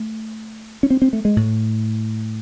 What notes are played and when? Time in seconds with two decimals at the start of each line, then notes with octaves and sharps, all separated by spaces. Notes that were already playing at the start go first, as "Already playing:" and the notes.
Already playing: A3
0.83 C#4
0.90 C4
1.02 C4
1.13 A3
1.25 G#3
1.36 A2